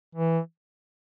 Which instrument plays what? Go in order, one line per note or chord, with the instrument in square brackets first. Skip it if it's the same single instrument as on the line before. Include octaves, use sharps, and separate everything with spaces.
[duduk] E3